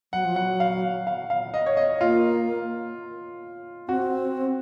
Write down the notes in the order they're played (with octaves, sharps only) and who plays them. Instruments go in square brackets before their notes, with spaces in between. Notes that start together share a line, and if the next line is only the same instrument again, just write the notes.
[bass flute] F#3 [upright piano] F#5
[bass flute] F3
[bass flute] F#3 [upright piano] F#5
[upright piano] F5
F5
F5
D#5
C#5
D#5
[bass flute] A#3 [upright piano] F4
[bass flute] C4 [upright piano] F#4